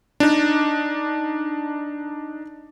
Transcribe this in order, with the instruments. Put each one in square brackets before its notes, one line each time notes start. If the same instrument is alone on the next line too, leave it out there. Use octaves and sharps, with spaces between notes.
[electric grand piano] D4 D#4